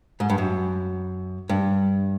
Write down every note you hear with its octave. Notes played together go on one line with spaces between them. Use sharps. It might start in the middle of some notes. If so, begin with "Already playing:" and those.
G#2
G2
F#2
G2